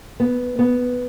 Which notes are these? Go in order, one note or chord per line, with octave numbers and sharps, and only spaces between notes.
B3
B3